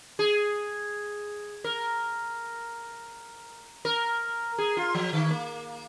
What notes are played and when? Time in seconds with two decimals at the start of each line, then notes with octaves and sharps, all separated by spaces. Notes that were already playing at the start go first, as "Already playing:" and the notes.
0.19 G#4
1.64 A#4
3.85 A#4
4.58 G#4
4.77 F4
4.94 F3
5.13 D#3
5.30 A#3